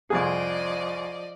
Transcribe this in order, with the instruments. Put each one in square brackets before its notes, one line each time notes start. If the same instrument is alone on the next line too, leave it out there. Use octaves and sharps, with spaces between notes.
[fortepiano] C2 F2 G#4 [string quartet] F3 D5 D#5